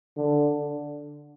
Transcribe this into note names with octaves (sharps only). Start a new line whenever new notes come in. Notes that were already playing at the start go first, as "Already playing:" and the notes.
D3